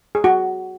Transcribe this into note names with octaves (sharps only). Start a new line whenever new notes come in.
G#4
F#4